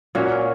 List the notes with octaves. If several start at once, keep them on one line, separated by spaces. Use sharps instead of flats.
A#2 A#3 C#4 F#4 C#5